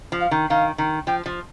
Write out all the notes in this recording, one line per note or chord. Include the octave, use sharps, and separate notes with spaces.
F3
F5
D#3
D#3 F5
D#3
F3 G5
F3